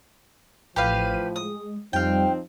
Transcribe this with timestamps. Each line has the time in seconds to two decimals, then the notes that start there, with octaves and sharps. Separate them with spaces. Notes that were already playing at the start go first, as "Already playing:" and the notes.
0.76 A1 A2 F3 G4 B4 F5 D#7
1.36 G#3 D#6
1.93 F2 F3 G3 C4 D#4 F5 G5